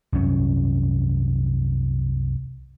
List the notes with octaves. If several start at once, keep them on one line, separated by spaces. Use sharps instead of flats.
C2 F#2 C#4